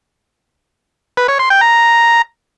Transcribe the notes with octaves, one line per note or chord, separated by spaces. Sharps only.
B4
C#5
C6
G5
A#5